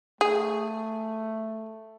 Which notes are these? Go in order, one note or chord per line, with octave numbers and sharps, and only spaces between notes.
A3 G#4